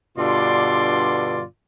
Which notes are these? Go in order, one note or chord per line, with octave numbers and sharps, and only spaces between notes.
G2 B2 D3 F4 D5 C6